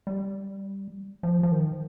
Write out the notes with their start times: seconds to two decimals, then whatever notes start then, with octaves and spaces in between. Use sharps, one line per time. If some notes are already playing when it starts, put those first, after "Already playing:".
0.07 G3
1.23 F3
1.43 F3
1.52 D#3